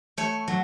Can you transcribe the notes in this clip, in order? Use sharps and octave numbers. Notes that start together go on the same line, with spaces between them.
A3 C#5
F#3